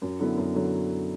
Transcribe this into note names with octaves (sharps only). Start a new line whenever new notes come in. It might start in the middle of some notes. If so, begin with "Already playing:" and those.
F#2
D3 F#3 B3 E4
F#2
D3 F#3